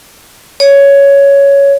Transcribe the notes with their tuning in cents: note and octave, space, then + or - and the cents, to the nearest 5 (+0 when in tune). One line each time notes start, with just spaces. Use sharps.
C#5 +10